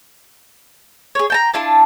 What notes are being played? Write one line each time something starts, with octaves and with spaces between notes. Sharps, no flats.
G#4 C#5
G5 A5 A#5
D4 E4 F4 A5